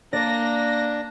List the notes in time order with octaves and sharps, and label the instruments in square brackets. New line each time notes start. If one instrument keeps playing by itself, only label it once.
[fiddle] A#3 [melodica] D4 [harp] D5 [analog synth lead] A#6